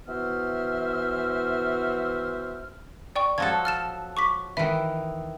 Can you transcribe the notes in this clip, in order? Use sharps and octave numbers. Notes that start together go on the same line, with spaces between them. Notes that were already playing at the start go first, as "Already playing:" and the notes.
E3 B3 F#4 C5 E5 F6
D5 G5 C#6
F3 F#3 A4 G#6
F6 A6 E7
C#6 D6 B6
D#3 E3 E5